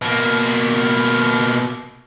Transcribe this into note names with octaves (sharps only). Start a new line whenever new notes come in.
B2 A#3